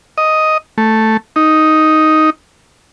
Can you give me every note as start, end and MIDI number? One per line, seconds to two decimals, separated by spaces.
0.18 0.57 75
0.78 1.17 57
1.36 2.30 63